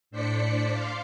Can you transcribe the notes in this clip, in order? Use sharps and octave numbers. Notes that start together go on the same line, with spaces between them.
A2 D4 C5 D5 B6 C#7
F5 C6 D6